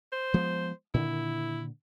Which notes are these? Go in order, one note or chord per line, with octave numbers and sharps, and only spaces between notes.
C5
F3 G#3 B3
A#2 D3 D#3 E4